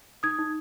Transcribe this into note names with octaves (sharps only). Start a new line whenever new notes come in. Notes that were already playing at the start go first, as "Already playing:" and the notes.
D#4 D#6 G#6
D#4